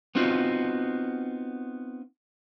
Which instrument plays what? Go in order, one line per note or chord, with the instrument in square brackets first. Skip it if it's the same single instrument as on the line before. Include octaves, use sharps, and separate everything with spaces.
[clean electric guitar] B3 C4 D#4 F4 F#4